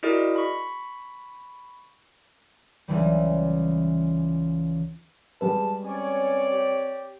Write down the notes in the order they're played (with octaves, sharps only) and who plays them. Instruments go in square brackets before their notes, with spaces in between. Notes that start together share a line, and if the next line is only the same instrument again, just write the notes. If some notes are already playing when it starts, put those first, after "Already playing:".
[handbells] E4 F#4 G#4 A#4 D5 D#5
B5 C#6
[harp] C#2 E3 G3
[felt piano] G3 G#3 B4 [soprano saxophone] A5
[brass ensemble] C4 C#5 D5 [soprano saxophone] C#4
[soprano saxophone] G4